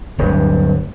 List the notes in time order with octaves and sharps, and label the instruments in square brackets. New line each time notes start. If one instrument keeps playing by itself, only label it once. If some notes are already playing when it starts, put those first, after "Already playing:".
[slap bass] D1 G2